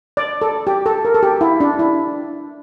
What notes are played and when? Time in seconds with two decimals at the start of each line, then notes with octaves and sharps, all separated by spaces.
0.17 D5
0.42 A4
0.67 G4
0.86 A4
1.05 A#4
1.14 A4
1.23 G4
1.41 E4
1.60 D4
1.79 E4